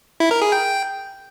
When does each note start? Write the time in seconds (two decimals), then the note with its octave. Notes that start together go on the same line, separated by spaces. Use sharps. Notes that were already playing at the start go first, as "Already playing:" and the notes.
0.20 E4
0.31 A#4
0.42 G#4
0.52 G5